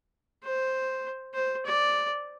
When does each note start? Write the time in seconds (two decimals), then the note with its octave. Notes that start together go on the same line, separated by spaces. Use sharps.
0.44 C5
1.34 C5
1.66 D5